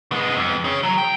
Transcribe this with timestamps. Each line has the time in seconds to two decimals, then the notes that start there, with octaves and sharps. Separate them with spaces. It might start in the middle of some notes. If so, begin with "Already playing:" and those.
0.12 G#3 B3
0.37 F2
0.65 G#4 C#5
0.83 F#3
0.98 G5